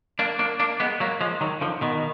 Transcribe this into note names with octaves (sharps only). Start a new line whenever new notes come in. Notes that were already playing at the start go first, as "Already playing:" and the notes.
A#3 D4
A#3 D4
A#3 D4
G#3 B3
F#3 A#3
F3 G#3
D#3 F#3
D3 F3
B2 D#3